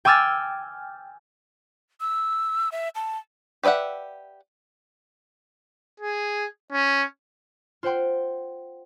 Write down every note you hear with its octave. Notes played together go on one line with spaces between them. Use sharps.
G5 G#5 D6 E6 F6 A6
E6
E5
A5
G4 B4 D5 E5 F#5
G#4
C#4
F4 C5 F#5 G5 C6